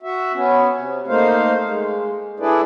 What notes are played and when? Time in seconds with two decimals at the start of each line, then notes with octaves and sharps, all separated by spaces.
0.02 F#4 E5
0.34 B3 C#4
0.77 C3
1.08 A3 A#3 D#4 C5 F5
1.65 G#3
2.40 D4 E4 G#4 A4 B4 D5